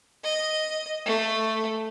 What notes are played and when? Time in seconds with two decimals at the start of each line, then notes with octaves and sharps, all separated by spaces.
0.24 D#5
1.06 A3